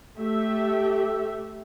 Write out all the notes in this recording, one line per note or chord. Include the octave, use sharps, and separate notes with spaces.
A3 G4 E5